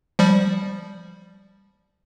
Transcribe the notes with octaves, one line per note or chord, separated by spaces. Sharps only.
F3 G3